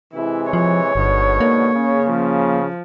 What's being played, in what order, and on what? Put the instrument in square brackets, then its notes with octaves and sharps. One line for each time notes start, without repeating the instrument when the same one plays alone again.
[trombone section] C3 E3 G#3 [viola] E4
[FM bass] F3 [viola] C#5
[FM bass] G1 [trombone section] G#2 B2 D3
[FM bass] A#3
[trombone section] C#3
[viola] F3